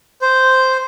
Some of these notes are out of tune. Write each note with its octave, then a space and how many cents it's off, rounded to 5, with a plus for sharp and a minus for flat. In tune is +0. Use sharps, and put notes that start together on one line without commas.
C5 -5